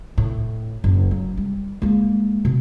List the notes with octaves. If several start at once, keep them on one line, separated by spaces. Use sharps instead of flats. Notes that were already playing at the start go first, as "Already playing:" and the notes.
A2
F#1
F#3
G3
G#3 A#3
B2